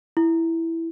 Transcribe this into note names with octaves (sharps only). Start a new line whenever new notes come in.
E4